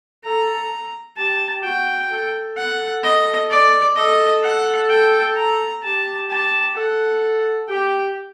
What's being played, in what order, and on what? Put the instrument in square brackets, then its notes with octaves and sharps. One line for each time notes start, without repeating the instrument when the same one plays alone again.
[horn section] A4 [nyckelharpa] A#5
[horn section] G4 [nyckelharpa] A5
[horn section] F#4 [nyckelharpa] G5
[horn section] A4
[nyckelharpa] F#5
D#5
D5
[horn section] A4 [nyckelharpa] D#5
[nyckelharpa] F#5
G5
A#5
[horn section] G4 [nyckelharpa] A5
[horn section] G4 [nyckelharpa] A5
[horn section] A4 [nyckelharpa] F#5
[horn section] G4 [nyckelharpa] G5